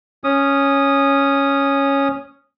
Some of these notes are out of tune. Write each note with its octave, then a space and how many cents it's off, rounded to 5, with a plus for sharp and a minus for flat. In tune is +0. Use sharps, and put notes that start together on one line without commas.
C#4 +0 D#6 -10